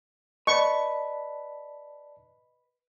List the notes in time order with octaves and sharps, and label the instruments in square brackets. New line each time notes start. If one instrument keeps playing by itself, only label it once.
[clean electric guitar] B4 [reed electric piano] D5 A5 [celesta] D#5 [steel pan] C#6